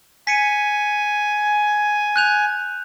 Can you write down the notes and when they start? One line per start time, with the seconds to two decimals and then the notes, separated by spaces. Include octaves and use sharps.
0.27 G#5 B6 C#7 D#7
2.16 F#6 G6 F7